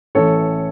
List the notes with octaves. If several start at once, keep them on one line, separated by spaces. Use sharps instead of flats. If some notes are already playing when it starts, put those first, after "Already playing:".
A1 A2 E3 A4 C#5